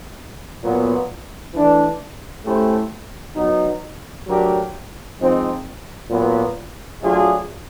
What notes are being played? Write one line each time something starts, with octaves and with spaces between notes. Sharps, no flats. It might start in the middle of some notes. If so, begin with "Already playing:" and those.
A#2 F#3 B3
E3 A3 D4
A3 C#4 E4 G4 C5
F#3 B3 D#4
F#3 A3 D4 G4 A#4
F3 G#3 C4 D#4
A#2 F#3 B3
F#3 A3 D4 F4 G#4